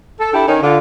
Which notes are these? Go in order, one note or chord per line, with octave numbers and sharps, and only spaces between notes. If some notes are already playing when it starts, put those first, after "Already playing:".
A4
D4 E4 G4 A4
D#3 C#4
D3 F4